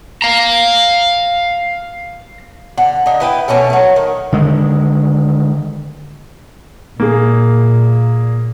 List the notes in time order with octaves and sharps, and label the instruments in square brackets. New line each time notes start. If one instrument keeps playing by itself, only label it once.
[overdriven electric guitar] F5 A#5
[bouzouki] D3 F#5
D3 D#4
E4 B4 G5
B2 A3 C#4 A4
F#3 A3
D#3
[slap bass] D3 D#3 G#3
[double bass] A#2 [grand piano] A#3 G#4